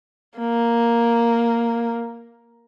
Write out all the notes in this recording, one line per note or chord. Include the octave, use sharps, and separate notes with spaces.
A#3